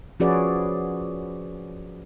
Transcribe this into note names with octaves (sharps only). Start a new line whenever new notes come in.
F3 C#4 F#4 G#4 B4 D5